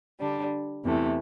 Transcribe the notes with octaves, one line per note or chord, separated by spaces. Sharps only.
D3 G3 D4
E2 C3 E3 A3